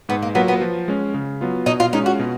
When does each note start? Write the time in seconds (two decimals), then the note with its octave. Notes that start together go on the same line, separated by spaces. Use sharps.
0.09 G#2 B3
0.22 A#3
0.35 F#3 A#3 B3 F4
0.48 B3
0.61 F3
0.88 G#3 C#4
1.14 C#3
1.41 F#3 B3 F4
1.66 B2 D#4
1.80 F4
1.93 G#3 C#4 D#4 F4
2.06 F#4
2.19 B2